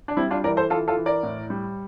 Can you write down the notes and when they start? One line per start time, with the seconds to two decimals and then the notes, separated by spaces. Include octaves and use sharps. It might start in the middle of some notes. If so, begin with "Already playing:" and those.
0.08 D4
0.17 G3 C4 E4
0.31 D4 F4
0.44 E3 A#4 D5
0.57 A4 C5
0.70 E3 F4 A4
0.88 F4 A4
0.97 E3
1.06 A#4 D5
1.23 A2
1.50 G3